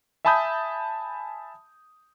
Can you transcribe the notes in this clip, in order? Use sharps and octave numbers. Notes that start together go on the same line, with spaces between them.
E5 G#5 A5 B5 D#6 G6